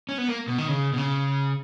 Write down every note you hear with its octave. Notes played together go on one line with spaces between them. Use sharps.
C#4
B3
A#3
B2
D#3
C#3
B2
C#3